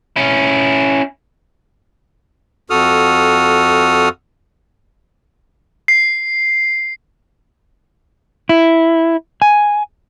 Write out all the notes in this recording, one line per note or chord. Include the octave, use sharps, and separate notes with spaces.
C#4 E4
F2 F#4 A4 D#6 F6
C7
E4
G#5